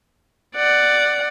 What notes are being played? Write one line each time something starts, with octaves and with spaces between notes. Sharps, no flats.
D5 F#5